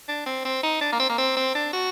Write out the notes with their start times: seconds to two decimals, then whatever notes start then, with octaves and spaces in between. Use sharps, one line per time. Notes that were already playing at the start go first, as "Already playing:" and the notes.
0.08 D4
0.26 C4
0.45 C4
0.63 D#4
0.81 D4
0.93 A#3
1.00 C4
1.10 A#3
1.18 C4
1.37 C4
1.55 D4
1.73 F#4